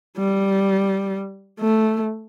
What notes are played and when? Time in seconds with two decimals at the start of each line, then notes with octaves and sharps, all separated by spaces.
0.18 G3
1.60 A3